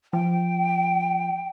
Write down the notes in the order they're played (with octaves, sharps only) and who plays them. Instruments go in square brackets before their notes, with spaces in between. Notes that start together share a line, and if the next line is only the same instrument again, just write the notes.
[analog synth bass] F3 [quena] G5